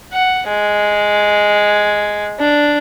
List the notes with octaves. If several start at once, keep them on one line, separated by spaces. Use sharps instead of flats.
F#5
G#3
D4